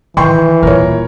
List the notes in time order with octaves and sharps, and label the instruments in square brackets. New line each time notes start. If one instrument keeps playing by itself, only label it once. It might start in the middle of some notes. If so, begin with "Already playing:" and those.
[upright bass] D#3 [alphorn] E3 [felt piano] G5 C6 C#6
[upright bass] D#1 F4 [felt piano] A#4 C#5